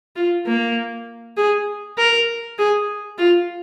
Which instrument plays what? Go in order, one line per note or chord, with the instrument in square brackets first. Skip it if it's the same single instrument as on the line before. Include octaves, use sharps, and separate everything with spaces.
[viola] F4
A#3
G#4
A#4
G#4
F4